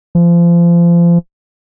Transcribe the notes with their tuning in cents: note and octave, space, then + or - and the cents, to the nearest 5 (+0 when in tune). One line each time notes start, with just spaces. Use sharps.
F3 -30